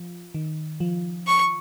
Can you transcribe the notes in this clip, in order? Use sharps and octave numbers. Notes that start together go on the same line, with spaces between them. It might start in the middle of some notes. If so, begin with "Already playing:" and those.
Already playing: F3
D#3
F3
C#6